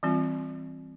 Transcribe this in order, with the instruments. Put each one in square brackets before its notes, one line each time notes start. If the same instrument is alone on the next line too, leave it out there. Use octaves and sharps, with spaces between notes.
[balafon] E3 G3 C4 F4